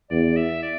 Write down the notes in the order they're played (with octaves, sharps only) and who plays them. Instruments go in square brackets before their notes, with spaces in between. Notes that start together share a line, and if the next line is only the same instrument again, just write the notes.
[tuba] E2 [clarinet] D5
[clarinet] E5
D5